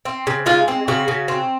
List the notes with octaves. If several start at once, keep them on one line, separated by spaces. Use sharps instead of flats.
C4
C#3
G#3 F4
C4
C#3 F#4
C#3
C4